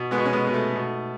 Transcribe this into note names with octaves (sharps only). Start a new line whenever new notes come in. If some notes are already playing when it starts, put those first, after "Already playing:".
Already playing: B2
G#3 B3
B2
C#4
G#3 B3
B2
A3
B2